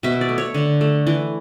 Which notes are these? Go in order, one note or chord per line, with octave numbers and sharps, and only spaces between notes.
B2 E5
D5
A3
C#5
D3
A3
E3